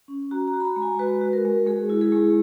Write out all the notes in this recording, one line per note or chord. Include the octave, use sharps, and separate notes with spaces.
C#4
F#4 A#5
A#5
F#4
B5
A#5
G#3
G#5
F#4 B4
F#4
A#4
G#3
G#3 G#4
E4
G#4
G#3